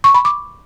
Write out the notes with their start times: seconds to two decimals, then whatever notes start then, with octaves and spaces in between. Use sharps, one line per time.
0.04 C#6
0.14 B5
0.25 D6